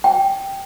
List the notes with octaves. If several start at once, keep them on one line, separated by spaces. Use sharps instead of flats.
G5